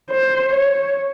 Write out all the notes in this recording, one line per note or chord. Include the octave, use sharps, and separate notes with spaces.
C5
C#5